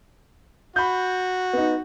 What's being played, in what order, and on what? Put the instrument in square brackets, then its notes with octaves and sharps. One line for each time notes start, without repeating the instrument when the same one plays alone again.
[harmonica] F#4 [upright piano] B5 G6
[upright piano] B3 D#4